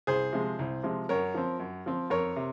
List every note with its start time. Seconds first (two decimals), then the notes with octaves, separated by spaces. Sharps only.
0.07 C2 G#4 C5
0.33 C3 F3 G#3
0.59 C2
0.83 C3 F3 G#3
1.09 F#2 A#4 C#5
1.34 F3 C4
1.60 F#2
1.86 F3 C4
2.10 F2 A#4 C#5
2.36 C3